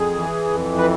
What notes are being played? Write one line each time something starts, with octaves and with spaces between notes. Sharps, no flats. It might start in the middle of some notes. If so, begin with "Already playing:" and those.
Already playing: F2 G#4
E3
F2
B4